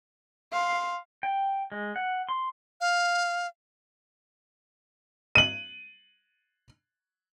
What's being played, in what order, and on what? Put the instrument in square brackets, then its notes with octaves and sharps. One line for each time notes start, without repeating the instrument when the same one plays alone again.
[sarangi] F5 [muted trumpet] C6
[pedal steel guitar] G5
G#3
F#5
C6
[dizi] F5
[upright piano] D#7 F#7